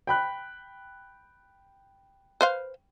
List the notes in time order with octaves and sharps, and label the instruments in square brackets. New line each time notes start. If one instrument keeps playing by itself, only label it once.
[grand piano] G5 B5 F#6
[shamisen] B4 C5 F5